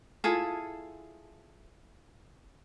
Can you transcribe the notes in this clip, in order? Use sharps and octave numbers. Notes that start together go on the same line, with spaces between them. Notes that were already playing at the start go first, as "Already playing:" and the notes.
E4 F4 G#4 A4